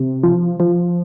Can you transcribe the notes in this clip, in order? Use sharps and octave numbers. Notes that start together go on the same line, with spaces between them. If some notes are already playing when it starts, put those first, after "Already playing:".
Already playing: C3
F3
F3